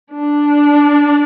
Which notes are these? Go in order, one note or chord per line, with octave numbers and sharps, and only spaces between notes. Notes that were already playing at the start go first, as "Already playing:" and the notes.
D4